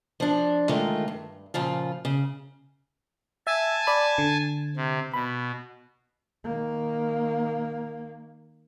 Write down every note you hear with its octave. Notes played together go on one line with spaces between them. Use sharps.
F3 D4
D3 D#3 G#3 A3 F4 A#4
G2
A#2 C#3 F3 F4
C#3
E5 G#5 A5
D5 B5
D3
C3
B2 B5
D#3 A#3